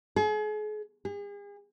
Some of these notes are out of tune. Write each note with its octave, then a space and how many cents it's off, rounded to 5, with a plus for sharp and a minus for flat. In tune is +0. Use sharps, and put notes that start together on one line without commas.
G#4 +40
G#4 -40